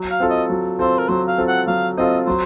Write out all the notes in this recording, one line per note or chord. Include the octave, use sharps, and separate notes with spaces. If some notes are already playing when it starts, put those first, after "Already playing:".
Already playing: F#3
F5
C4 F4 A4
D#5
F#3
C4 F4 A4 C5
A#4
F#3 C5
F5
C4 F4 A4
F#5
F#3 F5
C4 F4 A4 D#5
F#3 C5